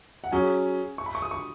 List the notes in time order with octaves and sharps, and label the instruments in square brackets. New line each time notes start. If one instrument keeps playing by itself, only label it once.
[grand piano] F#5
[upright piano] F#3 C#4 G#4 [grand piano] G#5
[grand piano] C#6
B5
C#6
D#6
C#6